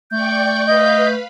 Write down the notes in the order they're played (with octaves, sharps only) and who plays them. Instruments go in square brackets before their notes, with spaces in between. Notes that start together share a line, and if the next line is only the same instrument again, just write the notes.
[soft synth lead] A3 [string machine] D5 G5 C#6 [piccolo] G6
[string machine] B4 F5 B5 [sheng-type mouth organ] D#5